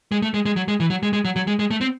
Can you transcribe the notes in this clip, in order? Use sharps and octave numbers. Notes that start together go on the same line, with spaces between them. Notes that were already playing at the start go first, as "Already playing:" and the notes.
G#3
A3
G#3
G#3
F#3
G#3
E3
F#3
G#3
G#3
F#3
F#3
G#3
G#3
A3
C4